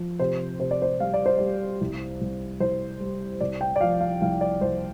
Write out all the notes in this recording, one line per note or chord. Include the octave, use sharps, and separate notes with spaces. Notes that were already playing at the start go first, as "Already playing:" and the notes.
Already playing: F3
C3 C5
C3 C5
D5
C5
G3 F5
D5
C5
G3 D5
C2
C2
C2 C5
G3
C2 D5
G5
D5
F3 F5
F5
C2 F5
D5
C2 C5